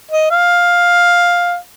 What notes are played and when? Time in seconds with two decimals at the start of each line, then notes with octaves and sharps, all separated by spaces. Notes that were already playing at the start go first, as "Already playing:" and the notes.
0.11 D#5
0.31 F5